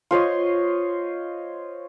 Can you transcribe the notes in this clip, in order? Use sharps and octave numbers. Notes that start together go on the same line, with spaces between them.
F4 C5 C#5 D#5